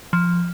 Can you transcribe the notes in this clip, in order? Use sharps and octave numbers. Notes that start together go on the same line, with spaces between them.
F3